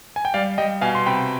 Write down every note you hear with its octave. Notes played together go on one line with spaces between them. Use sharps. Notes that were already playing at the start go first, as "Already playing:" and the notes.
G#5
G5
G3 D5 F5
G3 D#5 G5
B2 F5 G#5
C6
C3 G5 B5